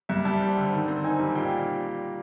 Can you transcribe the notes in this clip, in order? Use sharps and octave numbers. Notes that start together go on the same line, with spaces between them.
G2 E5
G3 A5
C4
D3
D#3
C4
D#4 G#5
G3
A#2 G5